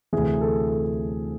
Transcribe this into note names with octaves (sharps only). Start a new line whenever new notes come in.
D2 C3 E3 G#4
A4
A4